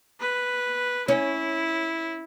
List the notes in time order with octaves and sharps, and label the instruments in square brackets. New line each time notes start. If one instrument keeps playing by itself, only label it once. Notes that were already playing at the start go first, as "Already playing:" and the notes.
[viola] B4
[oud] C#4 [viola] E4